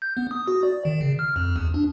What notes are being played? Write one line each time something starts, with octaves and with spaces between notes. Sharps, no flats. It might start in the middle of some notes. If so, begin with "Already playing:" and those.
G6
B3
D#6
F#4
D5
D#3
C#3
F6
F2
E2
D4